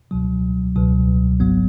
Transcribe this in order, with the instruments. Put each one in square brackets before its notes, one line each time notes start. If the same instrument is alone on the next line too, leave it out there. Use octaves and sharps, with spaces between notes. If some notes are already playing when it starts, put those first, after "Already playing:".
[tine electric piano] C#2 B2 F#3
C#2 B2 F#3
G#1 G#2 F#3 B3